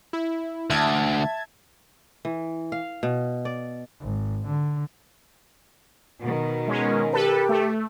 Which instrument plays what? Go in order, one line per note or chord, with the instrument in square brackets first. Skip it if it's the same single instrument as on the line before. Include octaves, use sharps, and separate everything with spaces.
[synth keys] E4
[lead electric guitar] D2 [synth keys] E5 A5 G#6
[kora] E3
F5
B2
D5
[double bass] G#1
D3
[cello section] B2 D#3
[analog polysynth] G#3 C#4 [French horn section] A#4
[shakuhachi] G4 [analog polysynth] A4 B4
[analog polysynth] A3